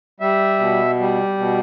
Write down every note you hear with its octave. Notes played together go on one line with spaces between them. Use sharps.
G3 E5
B2
G3
B2